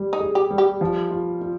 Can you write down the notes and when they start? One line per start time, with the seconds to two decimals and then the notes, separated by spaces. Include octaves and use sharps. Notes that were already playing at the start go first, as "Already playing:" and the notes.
Already playing: G3
0.13 D#4
0.20 G#4
0.35 G4
0.51 G3
0.58 G4
0.81 F3
1.11 F4
1.41 F4